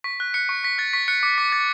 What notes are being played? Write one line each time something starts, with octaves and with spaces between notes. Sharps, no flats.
C#6 B6
F#6
F#6 C#7
C#6
C#6 B6
F#6 A6
C#6 B6
F#6 C#7
D6 C#7
D6 B6
D6 A6